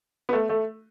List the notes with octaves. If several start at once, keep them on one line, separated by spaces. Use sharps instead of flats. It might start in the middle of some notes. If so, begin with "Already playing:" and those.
B3
A3
A3